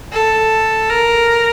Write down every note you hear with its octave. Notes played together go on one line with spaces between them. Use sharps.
A4
A#4